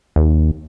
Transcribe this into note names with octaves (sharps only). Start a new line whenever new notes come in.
D#2